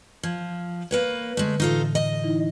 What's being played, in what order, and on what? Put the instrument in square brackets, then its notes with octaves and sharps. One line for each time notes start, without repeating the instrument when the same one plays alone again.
[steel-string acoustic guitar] F3 [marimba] G#6
[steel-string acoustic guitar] A#3 B4 C#5
[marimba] D3 [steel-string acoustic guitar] G#3 A3
[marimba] A2 D3 E3 [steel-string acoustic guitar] D#4 F4 A4
[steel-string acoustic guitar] D#5
[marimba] E3 D#4 E4